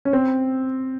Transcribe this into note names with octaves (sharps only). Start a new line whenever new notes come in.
C#4
C4